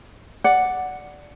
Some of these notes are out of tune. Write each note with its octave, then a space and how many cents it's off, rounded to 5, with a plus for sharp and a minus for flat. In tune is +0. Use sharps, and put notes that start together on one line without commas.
D5 +0 F#5 +0